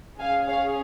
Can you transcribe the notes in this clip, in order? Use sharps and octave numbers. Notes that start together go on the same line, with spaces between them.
C#4 G#4 F5 G#5
C#5 F5